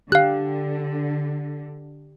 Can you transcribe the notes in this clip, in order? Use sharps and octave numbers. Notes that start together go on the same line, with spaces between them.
D3 G4 F5 F#6